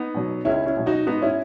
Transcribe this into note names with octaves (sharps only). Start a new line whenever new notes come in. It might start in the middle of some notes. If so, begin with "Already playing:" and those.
Already playing: B3 D#4
B2 F#3
C#2 C#4 E4
C#4 E4
B2 F#3
D#4 F#4
G#2 B3 D#4
C#4 E4